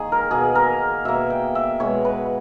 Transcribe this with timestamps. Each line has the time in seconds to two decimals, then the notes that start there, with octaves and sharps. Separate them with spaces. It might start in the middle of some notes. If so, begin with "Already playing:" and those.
Already playing: D#3 A#3 G#4
0.12 A#4
0.30 B2 A#3 G#4
0.55 A#4
1.05 B2 A#3 E5
1.30 G5
1.55 E5
1.80 B2 G#3 B3 C#5
2.05 B4